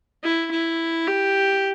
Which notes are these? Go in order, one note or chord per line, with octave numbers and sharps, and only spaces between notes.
E4
E4
G4